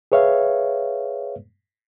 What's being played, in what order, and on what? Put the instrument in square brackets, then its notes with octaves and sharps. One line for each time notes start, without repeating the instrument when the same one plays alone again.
[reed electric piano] G#4 B4 C#5 E5 F5